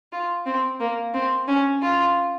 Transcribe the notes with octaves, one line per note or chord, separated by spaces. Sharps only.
F4
C4
A#3
C4
C#4
F4